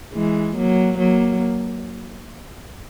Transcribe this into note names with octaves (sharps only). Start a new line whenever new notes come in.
E3 G#3
F#3 A#3
F#3 A#3